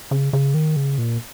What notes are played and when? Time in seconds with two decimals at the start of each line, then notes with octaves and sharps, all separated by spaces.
0.11 C#3
0.33 C#3
0.54 D#3
0.76 C#3
0.98 A#2